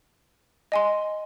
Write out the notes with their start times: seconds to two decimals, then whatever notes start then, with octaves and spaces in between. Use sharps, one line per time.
0.72 D#5 G#5 C6